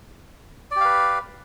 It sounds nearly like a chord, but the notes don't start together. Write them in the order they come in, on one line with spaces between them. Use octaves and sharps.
D5 G4 F5 B4